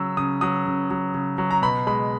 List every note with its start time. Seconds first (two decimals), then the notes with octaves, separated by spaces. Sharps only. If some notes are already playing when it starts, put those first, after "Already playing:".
Already playing: C#3 F#3 E6
0.17 C#3 D#6
0.41 F#3 D#6
0.66 C#3
0.90 F#3
1.14 C#3
1.38 F#3
1.51 A#5
1.62 B2 B5
1.87 G#3 B5